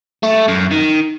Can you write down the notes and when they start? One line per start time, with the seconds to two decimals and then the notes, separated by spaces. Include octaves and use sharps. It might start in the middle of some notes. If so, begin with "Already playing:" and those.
0.23 A3
0.48 F#2
0.71 D#3